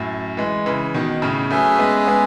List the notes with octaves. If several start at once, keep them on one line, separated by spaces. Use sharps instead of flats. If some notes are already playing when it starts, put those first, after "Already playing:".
Already playing: F#2 A2
E3 G#3
C#3 E3
B2 D#3
A2 C#3
F#3 A3 C#4 G#4 B4 E5 G#5
G#3 B3
G#3 B3